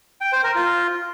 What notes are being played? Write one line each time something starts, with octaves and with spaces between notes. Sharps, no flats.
G5
C5
A#4
F4